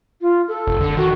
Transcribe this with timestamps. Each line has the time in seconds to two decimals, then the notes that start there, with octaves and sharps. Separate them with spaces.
0.21 F4
0.48 A4
0.67 F1
0.81 D3
0.97 D#3 F#4